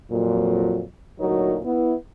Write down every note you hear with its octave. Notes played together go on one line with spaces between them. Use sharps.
F2 A#2 F#3
D2 A#2 F#3 D#4 A#4 C#5
B3 E4